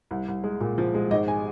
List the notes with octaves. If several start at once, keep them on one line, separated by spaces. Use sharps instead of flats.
C2
C2
G#3
A#2
F3
G#3
G#1 D#5
G#5